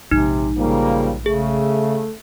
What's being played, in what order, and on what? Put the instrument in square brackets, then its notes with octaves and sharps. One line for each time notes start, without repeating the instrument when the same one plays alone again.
[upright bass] A#1 G#2 [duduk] C3 [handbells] D#4
[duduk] C#3 [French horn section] F3 G3 A#3
[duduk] C#3 [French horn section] A3 [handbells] G#4